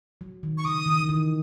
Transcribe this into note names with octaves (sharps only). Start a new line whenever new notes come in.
F#3
D#3
C#6
C#3 D#6
D#3
E3
D#3